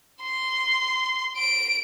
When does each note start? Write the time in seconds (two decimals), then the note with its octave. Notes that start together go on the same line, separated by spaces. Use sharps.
0.22 C6
1.37 D7